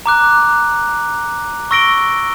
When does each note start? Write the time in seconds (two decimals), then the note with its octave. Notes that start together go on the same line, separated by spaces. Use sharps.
0.06 A#5 D6 F#6
1.71 C#6 E6 A#6 D7 G7